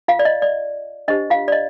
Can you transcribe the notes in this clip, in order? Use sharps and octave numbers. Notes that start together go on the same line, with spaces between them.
F4 F5
D5
D#5
D5
D4 G4 C5 D#5
F4 F5
D5
D#5